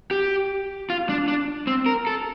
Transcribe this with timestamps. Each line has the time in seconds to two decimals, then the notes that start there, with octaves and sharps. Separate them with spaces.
0.11 G4
0.90 F4
1.09 D4
1.28 D4
1.67 C4
1.86 A#4
2.07 A4